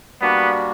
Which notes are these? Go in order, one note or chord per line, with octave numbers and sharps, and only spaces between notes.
G3 A#3 B3 D4 F#4